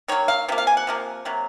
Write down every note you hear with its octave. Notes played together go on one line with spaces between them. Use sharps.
D#3 F#3 A#3 C#5
F5
C3 F3 A#3
F5
G#5
F#5
C3 F3 A#3
C3 F#3 A#3